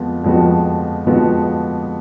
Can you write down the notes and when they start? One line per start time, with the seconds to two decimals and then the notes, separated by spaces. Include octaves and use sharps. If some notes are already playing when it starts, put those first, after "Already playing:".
Already playing: F2 F3 G#3 B3
0.24 F2 F3 G#3 B3 F#4
1.06 F2 F3 G#3 B3 F#4